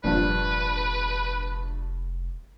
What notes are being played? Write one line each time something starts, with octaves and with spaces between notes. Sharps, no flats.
F1 A#1 G2 F3 B4